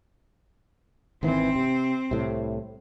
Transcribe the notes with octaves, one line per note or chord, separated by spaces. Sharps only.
G#1 D#3 E3 C4
C3
C2 A2 C3